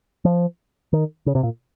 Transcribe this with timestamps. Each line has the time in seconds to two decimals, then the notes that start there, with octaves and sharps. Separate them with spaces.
0.25 F3
0.93 D#3
1.26 C#3
1.35 C3
1.43 A#2